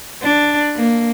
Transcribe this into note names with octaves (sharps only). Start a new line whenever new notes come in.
D4
A#3